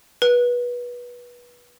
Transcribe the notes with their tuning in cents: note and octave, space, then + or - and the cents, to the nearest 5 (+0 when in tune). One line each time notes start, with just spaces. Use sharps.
B4 -25